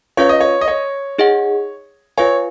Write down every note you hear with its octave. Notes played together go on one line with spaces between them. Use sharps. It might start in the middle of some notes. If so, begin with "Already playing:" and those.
C#4 F4 B4 C#5 F5
D#5
C#5
D#5
C#5
D#4 G#4 D#5 F#5
F4 B4 C#5 F5 G#5